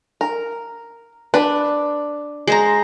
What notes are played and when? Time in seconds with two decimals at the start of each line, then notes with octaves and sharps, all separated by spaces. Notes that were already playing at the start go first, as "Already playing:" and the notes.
0.21 A#4
1.34 D4 B4
2.47 G#3 C5 A#5